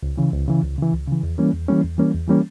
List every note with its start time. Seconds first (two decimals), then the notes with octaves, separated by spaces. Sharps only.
0.03 C#2
0.18 C#3 E3
0.33 C#2
0.48 C#3 E3
0.63 C#2
0.78 C#3 E3
0.93 C#2
1.08 C#3 E3
1.23 E2
1.38 E3 G3 A#3 C#4
1.53 E2
1.68 E3 G3 A#3 C#4
1.84 E2
1.98 E3 G3 A#3 C#4
2.14 E2
2.28 E3 G3 A#3 C#4